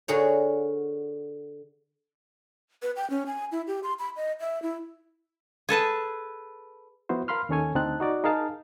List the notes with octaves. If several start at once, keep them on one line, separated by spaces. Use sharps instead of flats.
D3 F#4 G#4 A#4 C#5
B4
G5
C#4
G#5
E4
G4
C6
B5
D#5
E5
E4
G#4 A4 B4 A5
F3 B3 E4 F#4 C5
A#4 F5 B5 C6 F6
D#2 D#3 C#4 A4 C#5 G#5
D2 D3 C4 D#4 A5 F#6
D#4 F#4 D5
D#4 G#4 A#4 F5 A5